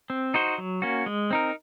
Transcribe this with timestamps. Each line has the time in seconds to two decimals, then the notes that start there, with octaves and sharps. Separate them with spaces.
0.10 C4
0.34 D#4 F#4 C5
0.58 F#3
0.82 A#3 C#4 F#4
1.06 G#3
1.31 C4 D#4 A#4